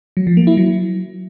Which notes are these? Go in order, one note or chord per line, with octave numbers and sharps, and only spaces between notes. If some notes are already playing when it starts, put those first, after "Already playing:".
F#3
F3
A#3
E4
F#3